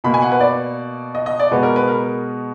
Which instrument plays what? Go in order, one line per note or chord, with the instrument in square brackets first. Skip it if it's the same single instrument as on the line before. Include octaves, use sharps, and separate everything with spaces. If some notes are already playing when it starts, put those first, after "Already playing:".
[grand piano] B2 A#3 B5
G#5
F#5
B4
D5
D#5
D#5
D5
B2 G#3 B3 B4
A#4
B4
A#4